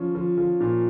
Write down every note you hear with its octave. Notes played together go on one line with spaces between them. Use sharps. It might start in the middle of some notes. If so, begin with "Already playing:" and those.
Already playing: F3 C#4
F3
F3
A#2